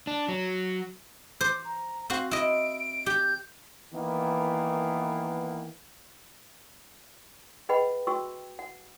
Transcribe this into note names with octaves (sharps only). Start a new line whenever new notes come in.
D4
F#3
C5 D6
A#5
C4 F#4 F5
E4 D#5 D7
G4 G6
D#3 E3 A#3 B3
G#4 B4 D#5 F#5 G5 B5
F#4 G5 C#6 E6
F#5